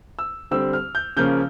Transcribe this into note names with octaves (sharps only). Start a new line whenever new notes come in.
E6
D3 G3 C4 E6
F6
G6
C#3 F3 A#3 C#4 G6